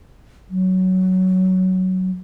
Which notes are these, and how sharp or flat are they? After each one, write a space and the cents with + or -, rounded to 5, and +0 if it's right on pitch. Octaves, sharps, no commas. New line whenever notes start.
F#3 +10